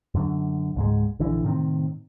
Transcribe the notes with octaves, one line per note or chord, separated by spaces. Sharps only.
F#2 D3
C#2 G#2 G#3
A#1 D3 E3
A2 C3 D#3 C4